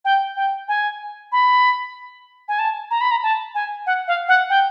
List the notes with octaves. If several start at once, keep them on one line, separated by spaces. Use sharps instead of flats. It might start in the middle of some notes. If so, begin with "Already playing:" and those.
G5
G5
G#5
B5
G#5
A5
A#5
B5
A#5
A5
G#5
F#5
F5
F#5
G5